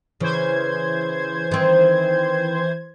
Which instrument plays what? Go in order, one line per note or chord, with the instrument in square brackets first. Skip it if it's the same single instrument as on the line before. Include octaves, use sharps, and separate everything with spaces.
[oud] C#3 [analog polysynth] E3 C5 G#6
[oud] D#3 C4